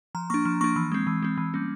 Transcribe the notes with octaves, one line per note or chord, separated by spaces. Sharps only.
F3 A#5
A#3 D4 C#6
F3
A#3 D4 C#6
E3
G#3 C4
E3
G#3 C4
E3
G3 A#3 C#4